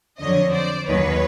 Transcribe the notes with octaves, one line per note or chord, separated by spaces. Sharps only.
F2 D3 F#3 C#5 D#5
C5 D5
D#2 D#3 F#3 B4 C#5